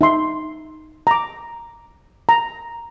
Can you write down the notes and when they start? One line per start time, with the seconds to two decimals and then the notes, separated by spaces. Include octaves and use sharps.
0.01 D#4 E5 C6
1.07 A#5 D6
2.29 A#5